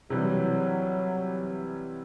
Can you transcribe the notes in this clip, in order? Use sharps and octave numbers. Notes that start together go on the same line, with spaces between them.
C3 E3 F#3 G3